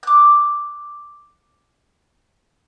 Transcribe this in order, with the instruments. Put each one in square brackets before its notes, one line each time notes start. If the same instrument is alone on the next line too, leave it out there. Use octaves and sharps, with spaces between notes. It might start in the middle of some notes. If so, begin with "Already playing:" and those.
[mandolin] D6 F#6